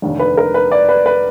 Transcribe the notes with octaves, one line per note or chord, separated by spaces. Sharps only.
F1 D#2 D3
B4
A#4
B4
D5
B4
B4